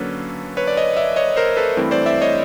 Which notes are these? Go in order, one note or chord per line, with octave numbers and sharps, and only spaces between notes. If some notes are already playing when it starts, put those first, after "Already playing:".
Already playing: D3 F#3 A#3 C#4 A4 B4
B4 C#5
D5
C#5 D#5
D5 E5
C#5 D#5
A#4 C5
A4 B4
G2 E3 A3 C4 E4
C5 D5
D5 E5
C#5 D#5